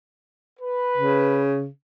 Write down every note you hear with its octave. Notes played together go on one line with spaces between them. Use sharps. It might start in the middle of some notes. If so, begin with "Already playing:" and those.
B4
C#3